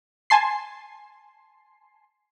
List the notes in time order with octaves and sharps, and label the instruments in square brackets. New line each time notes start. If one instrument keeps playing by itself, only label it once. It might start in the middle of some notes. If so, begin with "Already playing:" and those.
[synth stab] G#5 A5 C6 C7